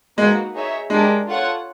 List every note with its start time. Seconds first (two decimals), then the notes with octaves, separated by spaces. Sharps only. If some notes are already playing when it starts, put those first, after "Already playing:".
0.18 G#3 A#3 D#4 F#4 B4
0.54 D#4 G#4 C#5 E5
0.90 G#3 D4 G4 A#4
1.27 F4 A4 C#5 F#5